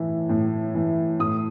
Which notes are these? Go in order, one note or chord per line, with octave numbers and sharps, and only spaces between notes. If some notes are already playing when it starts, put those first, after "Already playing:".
Already playing: A2 E3
A2
E3
A2 D#6